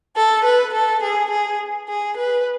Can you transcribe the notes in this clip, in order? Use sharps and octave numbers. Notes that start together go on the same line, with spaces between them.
A4
B4
A4
G#4
G#4
G#4
B4